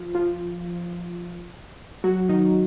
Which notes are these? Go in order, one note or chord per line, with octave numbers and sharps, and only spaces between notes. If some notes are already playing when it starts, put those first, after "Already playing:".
Already playing: F3 F4
F3 F4
F#3 F#4
D#3 D#4